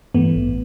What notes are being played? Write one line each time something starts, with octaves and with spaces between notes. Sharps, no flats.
G2 E3 A3 B3
A1